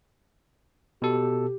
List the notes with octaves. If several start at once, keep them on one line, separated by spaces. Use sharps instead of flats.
B2 G4 A4